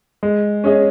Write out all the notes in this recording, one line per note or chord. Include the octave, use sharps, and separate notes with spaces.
G#3
C#4 G#4 D#5